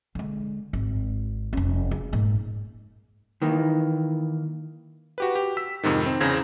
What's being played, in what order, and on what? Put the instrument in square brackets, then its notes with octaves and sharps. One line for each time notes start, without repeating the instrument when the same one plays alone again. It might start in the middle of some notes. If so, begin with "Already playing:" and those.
[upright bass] D3 G#3
G#1
F1 C#4
C#3
G#2 A#3
[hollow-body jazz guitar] D#3 E3 A#3
[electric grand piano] F#4 G4 B4
G4
E6 B6
F2 G#2 C3 D#3
C4
E2 C#3 C4 G#6 A#6